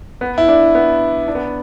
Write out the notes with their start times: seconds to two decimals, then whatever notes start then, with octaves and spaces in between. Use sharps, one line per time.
0.21 B3
0.38 E4
0.48 D4
0.75 B3
1.28 D4
1.35 B3